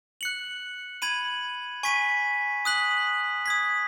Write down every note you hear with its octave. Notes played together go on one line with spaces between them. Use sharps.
F#6 C#7 F#7
B5 G#6 D#7 F#7
G#5 C#6 B6 D#7
D#6 F#6 B6 F#7
D#6 G#6 B6